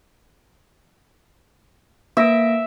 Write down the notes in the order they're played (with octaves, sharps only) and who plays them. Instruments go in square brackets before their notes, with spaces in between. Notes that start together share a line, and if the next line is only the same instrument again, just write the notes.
[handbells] A#3 A#6 D7 [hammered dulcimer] E5